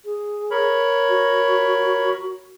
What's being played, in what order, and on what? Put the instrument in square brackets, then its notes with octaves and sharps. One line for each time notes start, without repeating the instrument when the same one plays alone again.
[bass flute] G#4
[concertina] A#4 C#5 B5
[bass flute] F#4